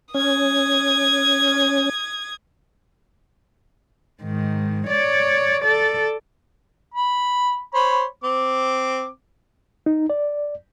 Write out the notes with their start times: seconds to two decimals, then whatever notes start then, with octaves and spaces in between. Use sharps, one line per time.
0.14 C#4 D#6 G#6
4.23 G#2 D#3
4.87 C#5 D5
5.63 A4 D5
6.94 B5
7.74 C5 C#5 B5
8.24 C4 D6
9.86 D#4
10.10 D5